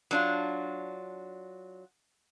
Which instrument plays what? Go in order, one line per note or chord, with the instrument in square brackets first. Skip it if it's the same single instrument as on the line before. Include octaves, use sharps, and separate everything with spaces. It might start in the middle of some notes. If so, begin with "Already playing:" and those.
[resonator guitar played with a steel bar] F#3 D4 F4